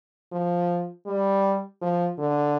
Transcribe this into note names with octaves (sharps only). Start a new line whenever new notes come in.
F3
G3
F3
D3